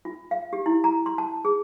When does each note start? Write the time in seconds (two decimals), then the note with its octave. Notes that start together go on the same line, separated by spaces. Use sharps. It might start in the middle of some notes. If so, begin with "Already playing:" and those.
0.05 F4
0.31 F5
0.53 G4
0.66 E4
0.84 A#5
1.06 C6
1.18 A5
1.45 G#4